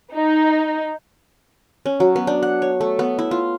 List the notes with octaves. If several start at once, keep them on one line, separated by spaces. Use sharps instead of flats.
D#4
C#4
F#3
B3
D4
F#5
C#5
A3
B3
E4
F4